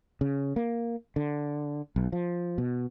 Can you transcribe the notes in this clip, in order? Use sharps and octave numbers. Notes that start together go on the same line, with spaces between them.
C#3
A#3
D3
B1
F3
B2